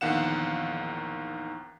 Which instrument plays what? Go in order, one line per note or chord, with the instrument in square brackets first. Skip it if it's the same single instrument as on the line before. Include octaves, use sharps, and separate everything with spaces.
[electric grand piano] A#1 E2 D#3 F5 F#5 E7